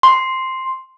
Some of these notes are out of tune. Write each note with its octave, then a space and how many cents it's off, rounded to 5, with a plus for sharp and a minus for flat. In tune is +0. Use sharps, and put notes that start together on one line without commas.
C6 +0